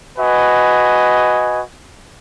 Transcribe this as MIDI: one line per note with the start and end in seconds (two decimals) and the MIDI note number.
0.17 1.61 66
0.17 1.61 71
0.17 1.61 75
0.17 1.61 80